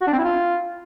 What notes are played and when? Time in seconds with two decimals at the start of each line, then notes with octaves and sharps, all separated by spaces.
0.02 F#4
0.07 D4
0.13 C4
0.18 E4
0.24 F4